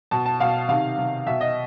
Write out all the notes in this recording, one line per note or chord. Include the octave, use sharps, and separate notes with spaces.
B2 A5
A5
B2 F5
C3 D#3 F5
C3 D#3
B2 E5
D#5